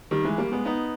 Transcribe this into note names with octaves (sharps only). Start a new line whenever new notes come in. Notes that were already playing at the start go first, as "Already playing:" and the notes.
D#3 G3
E3 G#3
G3 A#3
G#3 B3
B3 D#4